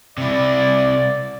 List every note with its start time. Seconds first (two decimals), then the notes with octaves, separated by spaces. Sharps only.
0.18 C3 E4 D5